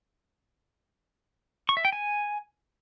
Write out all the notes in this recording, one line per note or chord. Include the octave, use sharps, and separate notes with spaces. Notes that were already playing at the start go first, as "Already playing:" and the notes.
C#6
E5
G5
G#5